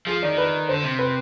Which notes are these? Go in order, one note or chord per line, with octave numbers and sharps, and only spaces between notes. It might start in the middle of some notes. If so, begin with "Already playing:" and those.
F3 G#4
D#3 D5
B4
D3 C5
C3
B4